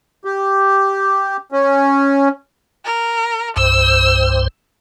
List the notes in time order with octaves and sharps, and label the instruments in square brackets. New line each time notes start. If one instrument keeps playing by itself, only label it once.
[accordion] G4
C#4
[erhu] A#4
[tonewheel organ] C2 G2 C5 [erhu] E6